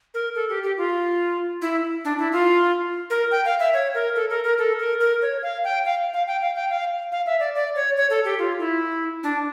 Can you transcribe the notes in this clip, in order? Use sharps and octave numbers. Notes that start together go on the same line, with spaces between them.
A#4
A4
G4
G4
F4
E4
D4
E4
F4
A#4
G5
F5
E5
C#5
A#4
A4
A#4
A#4
A4
A#4
A#4
C#5
F5
G5
F5
F5
G5
F5
G5
F5
F5
E5
D5
D5
C#5
C#5
A4
G4
F4
E4
D4